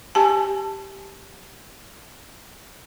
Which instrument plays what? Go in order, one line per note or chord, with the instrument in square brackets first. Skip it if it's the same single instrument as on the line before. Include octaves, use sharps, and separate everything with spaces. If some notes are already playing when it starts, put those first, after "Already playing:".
[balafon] G4 G#5 A5